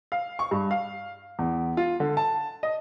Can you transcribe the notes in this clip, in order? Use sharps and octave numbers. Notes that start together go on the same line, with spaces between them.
F5
C#6
G2
F5
E2
F4
D3
A5
D#5